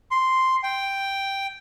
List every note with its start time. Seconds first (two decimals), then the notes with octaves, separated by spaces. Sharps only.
0.11 C6
0.63 G5